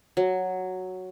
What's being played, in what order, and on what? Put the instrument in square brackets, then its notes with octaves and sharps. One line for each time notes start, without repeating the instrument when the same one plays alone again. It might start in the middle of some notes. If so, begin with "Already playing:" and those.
[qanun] F#3